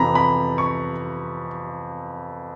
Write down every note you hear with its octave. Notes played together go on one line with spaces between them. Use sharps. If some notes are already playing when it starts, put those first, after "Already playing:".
Already playing: F2 C3 E3 A#5 B5
B5
C#6